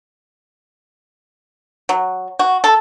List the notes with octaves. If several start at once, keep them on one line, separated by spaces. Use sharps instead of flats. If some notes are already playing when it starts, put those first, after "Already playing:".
F#3
F#4
A4